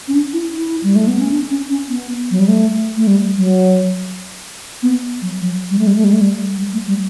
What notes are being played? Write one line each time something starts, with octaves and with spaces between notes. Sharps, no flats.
C#4
D4
E4
E4
G3
A3
B3
C#4
D4
C#4
C#4
B3
F#3
G3
A3
A3
G3
F#3
B3
F#3
F#3
G3
A3
G3
A3
G3
A3
G3
G3
A3
G3